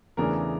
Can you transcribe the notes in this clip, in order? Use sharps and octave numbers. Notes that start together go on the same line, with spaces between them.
E2 C#3 E3 A3 D4 A#4